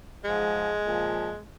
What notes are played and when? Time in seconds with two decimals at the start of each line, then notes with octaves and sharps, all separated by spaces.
0.25 G#2 F3 G#3
0.85 A#2 F3